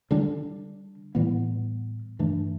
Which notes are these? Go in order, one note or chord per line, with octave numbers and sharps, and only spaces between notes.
D3 G3 D4
A2 E3 G3 B3
G2 E3 A3 D4